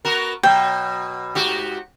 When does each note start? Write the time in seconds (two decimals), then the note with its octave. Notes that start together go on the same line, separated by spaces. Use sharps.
0.05 B3 F#4 A#4
0.43 B2 F#3 G5
1.35 G#2 F#4 G4